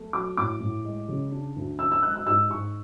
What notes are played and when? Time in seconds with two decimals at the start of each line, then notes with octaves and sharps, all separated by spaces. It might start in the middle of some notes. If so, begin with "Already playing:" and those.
Already playing: A3
0.13 F#3 D6
0.37 A2 D6
0.60 A2
0.84 G#3
1.08 C#3
1.32 D4
1.56 D2
1.79 D4 E6
1.92 E6
2.03 G#3 F#6
2.16 E6
2.27 G#2 E6
2.50 G#2 C#6